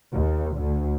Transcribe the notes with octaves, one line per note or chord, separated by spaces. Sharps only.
D#2
D2